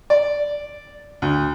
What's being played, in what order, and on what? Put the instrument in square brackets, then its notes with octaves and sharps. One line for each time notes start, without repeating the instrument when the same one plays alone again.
[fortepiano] D5
D2